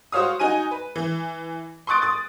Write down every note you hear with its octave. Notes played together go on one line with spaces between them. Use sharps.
F#4 C5 C#5 F5 D#6
D#4 F#4 G#5 D#7
B4
E3
C6 C#6 D#6 F#6 A6 D7
D#6 A6